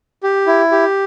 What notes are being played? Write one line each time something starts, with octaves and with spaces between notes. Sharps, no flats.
G4
E4
G4